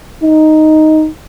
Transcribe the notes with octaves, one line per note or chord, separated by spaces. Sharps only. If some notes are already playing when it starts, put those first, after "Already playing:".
D#4